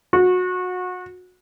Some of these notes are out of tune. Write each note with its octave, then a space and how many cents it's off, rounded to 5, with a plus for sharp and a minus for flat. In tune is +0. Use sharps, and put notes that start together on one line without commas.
F#4 -25